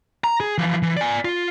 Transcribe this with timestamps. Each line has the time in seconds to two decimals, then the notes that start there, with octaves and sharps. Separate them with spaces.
0.24 A#5
0.40 G#4
0.58 E3 F3
0.83 E3
0.97 D5 G#5
1.25 F4